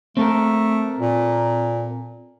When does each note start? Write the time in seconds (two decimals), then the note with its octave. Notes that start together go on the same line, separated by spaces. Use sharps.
0.17 A3 C4 A4 A#4
0.99 A#2